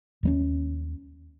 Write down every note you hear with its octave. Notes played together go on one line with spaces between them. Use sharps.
D#2 G3 C#4